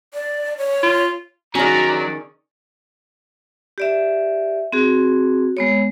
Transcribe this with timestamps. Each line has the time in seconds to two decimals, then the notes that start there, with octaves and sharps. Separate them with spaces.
0.14 D5
0.58 C#5
0.83 F4
1.55 D#3 F#3 C#4 G#4 D5 A#5
3.78 G4 D5 E5
4.73 C4 F#4 G#4
5.57 G#3 B3 C#5